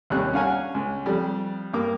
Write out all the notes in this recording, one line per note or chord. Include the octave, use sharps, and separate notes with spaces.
D#2 C3 G3 C#4 F#6
C#4 D4 F5 F#5 G#5 A#5
C#2
F2 G3
G2 A#3 D6